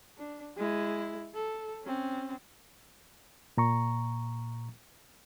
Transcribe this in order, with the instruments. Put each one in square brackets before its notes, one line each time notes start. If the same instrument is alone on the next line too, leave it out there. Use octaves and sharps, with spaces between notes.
[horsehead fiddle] D4
G#3 E4
A4
C4 C#4
[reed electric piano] A#2 A#5 C#6